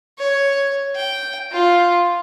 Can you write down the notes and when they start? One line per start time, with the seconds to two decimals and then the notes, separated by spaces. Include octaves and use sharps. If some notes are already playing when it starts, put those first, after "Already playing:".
0.18 C#5
0.96 G5
1.52 F4